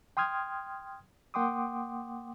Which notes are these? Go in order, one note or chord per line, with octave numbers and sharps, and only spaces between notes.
G5 C6 D#6 F6 G#6
A#3 F#5 G5 C6 D6 D#6